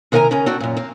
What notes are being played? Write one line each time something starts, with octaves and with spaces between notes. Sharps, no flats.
C3 D#3 A#4 F#5 G#5 A#5
C#3 C#4 A#4
C4 D4 F#4 G5
F#2 A#2
A#3 C4